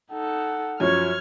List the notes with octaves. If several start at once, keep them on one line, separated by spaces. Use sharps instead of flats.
D#4 A4 F#5
F#2 F3 C#5 F6 G#6